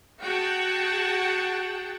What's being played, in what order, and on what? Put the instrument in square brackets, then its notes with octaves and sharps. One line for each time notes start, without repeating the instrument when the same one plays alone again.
[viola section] F#4 G#4 F#5 G5 A5